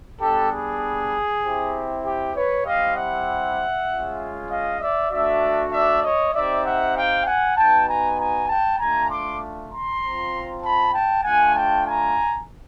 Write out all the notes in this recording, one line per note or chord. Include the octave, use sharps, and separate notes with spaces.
G3 B3 D4 G4 A4
G#4
C4 E4 G4
G4
B4 C#5
G3 C4 E4 G4 D#5 F5
E5 F#5
G#3 C#4 F4
D#5 F5
D5 E5
A3 D4 F#4 D5 E5
D5 E5
C#5 D#5
C4 D#4 G4 D5 E5
E5 F#5
F5 G5
F#5 G#5
B3 D#4 F#4 G5 A5
G#5 A#5
G#5 A#5
G5 A5
A3 D4 F4 G#5 A#5
C6 D6
A#5 C6
C4 F4
A5 B5
G5 A5
A3 D4 F4 F#5 G#5
G5 A5
G#5 A#5